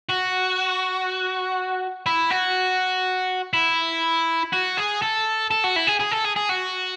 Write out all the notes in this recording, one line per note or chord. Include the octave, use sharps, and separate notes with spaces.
F#4
E4
F#4
E4
F#4
G#4
A4
A4
F#4
E4
G#4
G#4
A4
G#4
G#4
F#4